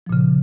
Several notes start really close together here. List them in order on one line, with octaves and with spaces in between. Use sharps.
F3 A#2 C#3